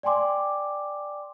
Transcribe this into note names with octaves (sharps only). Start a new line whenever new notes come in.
D5 G5 G#5 C6 D6